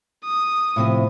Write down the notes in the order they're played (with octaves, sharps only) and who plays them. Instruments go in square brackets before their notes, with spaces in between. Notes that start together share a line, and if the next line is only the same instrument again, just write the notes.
[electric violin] D#6
[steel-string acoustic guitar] A2 C3 F3